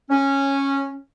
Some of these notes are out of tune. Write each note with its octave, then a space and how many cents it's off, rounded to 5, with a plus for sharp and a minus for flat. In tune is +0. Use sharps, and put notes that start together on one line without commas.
C#4 -10